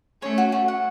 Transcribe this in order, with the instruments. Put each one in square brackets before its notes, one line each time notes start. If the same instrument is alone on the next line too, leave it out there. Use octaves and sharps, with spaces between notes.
[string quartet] A3 C#4 [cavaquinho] C#5
[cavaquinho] F#4
F#4
F#5